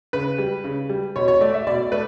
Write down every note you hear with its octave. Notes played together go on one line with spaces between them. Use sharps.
C#3 B4
G3
C#3
G3
B2 C#5
C#5
A3 D5
E5
B2 D5
A3 B4